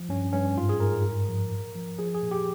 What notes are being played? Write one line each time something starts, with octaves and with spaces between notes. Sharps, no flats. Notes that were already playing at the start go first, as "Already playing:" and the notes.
Already playing: F3
G2 C#4
G2 C#4
G#2 F4
G#4
G#2 A#4
G2
F3
A#2
F3
F3 G#4
G#4
A#2
G4